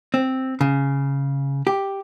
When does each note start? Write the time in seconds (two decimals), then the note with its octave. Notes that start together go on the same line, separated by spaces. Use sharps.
0.14 C4
0.61 C#3
1.67 G4